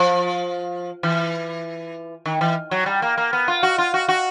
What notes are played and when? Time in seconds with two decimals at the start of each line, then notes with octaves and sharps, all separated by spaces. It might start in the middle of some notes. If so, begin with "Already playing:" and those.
Already playing: F3
1.03 E3
2.26 D#3
2.41 E3
2.71 F#3
2.86 G3
3.02 A#3
3.18 A#3
3.33 B3
3.48 F4
3.63 F#4
3.78 F4
3.94 F#4
4.09 F#4